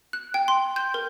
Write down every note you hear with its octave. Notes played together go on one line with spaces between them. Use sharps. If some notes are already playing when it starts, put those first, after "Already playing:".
F#6
G5
C6
G6
A#4